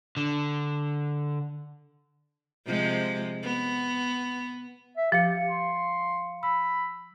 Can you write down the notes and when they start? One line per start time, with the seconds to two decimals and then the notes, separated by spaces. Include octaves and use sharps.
0.17 D3
2.66 C3 F3 G#3
3.43 B3
4.97 E5
5.12 F3 G4 F5 C#7
5.49 C6
6.43 B5 E6